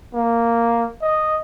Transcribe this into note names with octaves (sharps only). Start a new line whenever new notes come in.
A#3
D#5